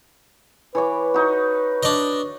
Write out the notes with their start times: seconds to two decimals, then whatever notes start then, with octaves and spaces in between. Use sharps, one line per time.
0.75 E3 B4 C#5 D6
1.14 D#4 F#4
1.83 D4 D#5